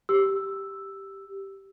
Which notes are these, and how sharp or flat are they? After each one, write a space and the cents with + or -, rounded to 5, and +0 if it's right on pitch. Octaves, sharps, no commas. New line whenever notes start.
G4 +0 E6 +0